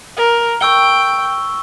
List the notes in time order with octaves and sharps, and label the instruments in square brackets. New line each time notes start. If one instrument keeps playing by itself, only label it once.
[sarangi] A#4
[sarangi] G5 [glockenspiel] C#6 E6 G7